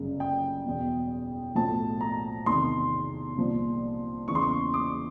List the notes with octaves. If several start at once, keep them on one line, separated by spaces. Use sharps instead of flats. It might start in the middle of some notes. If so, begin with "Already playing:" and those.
Already playing: G1 F#2 C#3
G5
E2 B2
B1 A2 F3 A5
A#5
E2 C3 D#3 C6
C2 A#2 F3
E2 C#3 E3 C#6
C6
C#6
D6